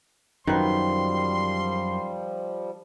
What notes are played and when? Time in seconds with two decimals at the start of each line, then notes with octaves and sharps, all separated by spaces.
0.47 F#2 D#3 F3 G3 B4 C6